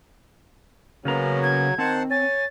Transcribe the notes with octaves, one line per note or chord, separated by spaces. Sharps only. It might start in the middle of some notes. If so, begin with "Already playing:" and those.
C#3 F#3 A#3 B3 C#4 A#5
G#6
D#3 C4 C5 F#5 A5
C#5 G#5 A6